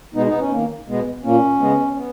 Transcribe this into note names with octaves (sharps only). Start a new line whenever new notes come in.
B2 G#3 B3 D#4
B3 D#4
C#4
D#3 A#3
B2 G#3 B3
A#2 A#3 C#4
C#3 G#3 B3
C#4
B3